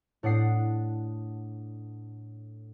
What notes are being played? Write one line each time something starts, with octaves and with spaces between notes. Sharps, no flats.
A2 D4 F#5 D#6 C7